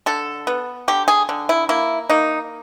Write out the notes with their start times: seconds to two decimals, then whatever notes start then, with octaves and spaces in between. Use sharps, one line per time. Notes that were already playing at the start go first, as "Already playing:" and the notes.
0.06 D3 A4
0.47 B3
0.88 D3 G4
1.08 G#4
1.29 D3
1.49 E4
1.69 A#3 E4
2.10 A#3 D#4